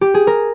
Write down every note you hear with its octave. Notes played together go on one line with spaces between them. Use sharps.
G4
G#4
A#4